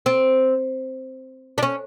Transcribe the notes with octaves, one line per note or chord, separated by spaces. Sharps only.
C4
D4
C#4